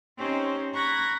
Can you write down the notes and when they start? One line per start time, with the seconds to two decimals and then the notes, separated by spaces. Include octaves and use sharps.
0.18 C4 C#4 D#4 G4 C5 C#5
0.74 A#5 B5 C#6 F#6 G#6 A#6